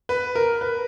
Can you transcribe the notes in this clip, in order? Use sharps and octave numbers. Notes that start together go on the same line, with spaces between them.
B4
A#4
B4